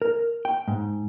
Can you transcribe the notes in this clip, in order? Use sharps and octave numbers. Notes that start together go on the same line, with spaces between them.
A#4
G5
G#2